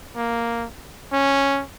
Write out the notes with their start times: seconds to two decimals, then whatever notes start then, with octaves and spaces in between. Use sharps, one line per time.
0.16 A#3
1.12 C#4